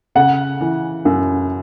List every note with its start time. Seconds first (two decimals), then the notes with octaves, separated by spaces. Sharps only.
0.15 C#3 F#5
0.61 E3
1.05 F#2